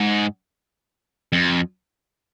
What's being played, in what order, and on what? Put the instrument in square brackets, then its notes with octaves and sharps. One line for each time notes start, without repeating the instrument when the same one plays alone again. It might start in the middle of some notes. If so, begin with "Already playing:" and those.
Already playing: [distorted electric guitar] G#2
F2